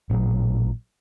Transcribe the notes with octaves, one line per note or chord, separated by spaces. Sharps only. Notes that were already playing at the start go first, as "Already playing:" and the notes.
A1 A#2 C#3 F#3